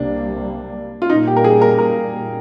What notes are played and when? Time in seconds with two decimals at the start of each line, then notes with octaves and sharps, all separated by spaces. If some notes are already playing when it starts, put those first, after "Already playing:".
Already playing: C2 C3 G3 A#3 D4
1.02 F4
1.09 A#2 G3 A#3 D#4
1.27 G4
1.37 A#4
1.44 G#4
1.62 A#4
1.79 A#4